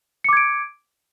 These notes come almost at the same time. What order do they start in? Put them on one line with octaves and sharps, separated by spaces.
C#7 D6 G#6 D7